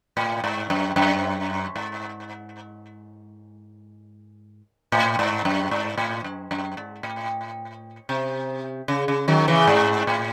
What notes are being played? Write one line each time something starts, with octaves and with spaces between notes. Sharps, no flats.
A2
G#2
F#2
F#2
G#2
A2
G#2
F#2
G#2
A2
F#2
F#2
G#2
A2
C3
C#3
C#3
D#3 F#3
C#3 E3
G#2
A2